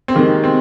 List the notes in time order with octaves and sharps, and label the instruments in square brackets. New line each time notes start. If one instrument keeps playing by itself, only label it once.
[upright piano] C4
C3 D#3 G#3 A#3
C4